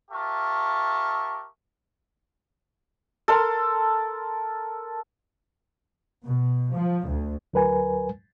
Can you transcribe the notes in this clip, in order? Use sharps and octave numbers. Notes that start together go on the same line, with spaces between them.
F4 G4 A#4 E5 A5 C#6
A4 A#4 C6
B2
F3
D2
D2 F#3 A#4 B4 G#5